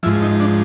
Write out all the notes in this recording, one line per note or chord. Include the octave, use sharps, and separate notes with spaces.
G#2 F3 E4
D#4
D4